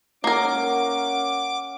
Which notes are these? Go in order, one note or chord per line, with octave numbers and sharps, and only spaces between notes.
A#3 C#4 A#4 F#5 D6